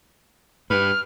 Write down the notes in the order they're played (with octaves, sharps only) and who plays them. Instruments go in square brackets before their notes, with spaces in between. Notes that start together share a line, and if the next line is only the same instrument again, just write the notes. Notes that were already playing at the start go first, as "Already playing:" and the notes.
[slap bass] G2 [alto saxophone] B4 [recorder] F6